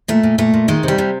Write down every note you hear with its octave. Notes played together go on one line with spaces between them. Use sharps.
A#2 A3
A#2
A#2 A3
A#2
D#3 G#3
C3 G3
C3